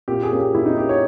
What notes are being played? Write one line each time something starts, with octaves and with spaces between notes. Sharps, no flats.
A#2 G4
G#4
A#3 C#4
G4
A#2 E4
D#4
A#3 C#4 G4
C#5